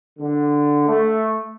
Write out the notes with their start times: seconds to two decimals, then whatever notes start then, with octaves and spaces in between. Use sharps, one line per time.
0.19 D3
0.88 A3